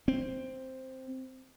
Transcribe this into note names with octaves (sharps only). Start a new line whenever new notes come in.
C4